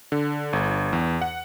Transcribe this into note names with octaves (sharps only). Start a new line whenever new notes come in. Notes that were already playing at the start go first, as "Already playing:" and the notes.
D3
G1
E2
F#5